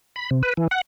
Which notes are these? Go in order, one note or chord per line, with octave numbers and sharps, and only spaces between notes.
B5
C3
B4
E3
F#5